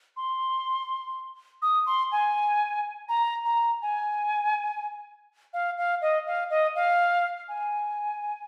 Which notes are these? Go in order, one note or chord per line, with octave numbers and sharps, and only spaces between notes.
C6
D#6
C6
G#5
A#5
A#5
G#5
F5
F5
D#5
F5
D#5
F5
G#5